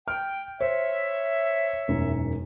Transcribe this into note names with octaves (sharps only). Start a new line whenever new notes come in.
G5 F6
C5 C#5 E5
E1 F#2 D#4